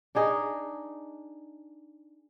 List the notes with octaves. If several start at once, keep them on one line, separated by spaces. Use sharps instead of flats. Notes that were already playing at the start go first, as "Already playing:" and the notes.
D4 D#4 G#4 D#5